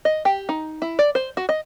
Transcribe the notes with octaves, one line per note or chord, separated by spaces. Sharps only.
D#5
G4
D#4
E4
D5
C5
F#4
D#5